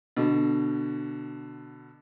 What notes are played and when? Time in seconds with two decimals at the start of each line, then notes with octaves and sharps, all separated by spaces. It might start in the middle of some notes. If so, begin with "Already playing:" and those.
0.17 B2 D3